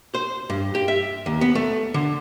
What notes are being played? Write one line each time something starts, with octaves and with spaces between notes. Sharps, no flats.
C5
G2
G4
E5
D#2
B3
A3
D3